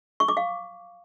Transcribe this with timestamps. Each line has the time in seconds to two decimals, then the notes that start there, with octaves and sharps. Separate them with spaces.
0.20 C#6
0.28 D6
0.37 F5